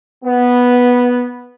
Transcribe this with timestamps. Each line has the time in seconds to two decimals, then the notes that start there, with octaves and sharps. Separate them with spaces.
0.24 B3